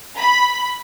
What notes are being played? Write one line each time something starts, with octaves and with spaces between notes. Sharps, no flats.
B5